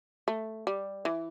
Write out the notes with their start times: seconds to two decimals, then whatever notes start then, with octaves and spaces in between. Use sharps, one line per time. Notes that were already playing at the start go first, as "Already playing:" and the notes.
0.28 A3
0.67 G3
1.05 E3